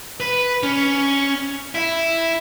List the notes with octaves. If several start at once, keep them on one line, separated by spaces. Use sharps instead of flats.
B4
C#4
E4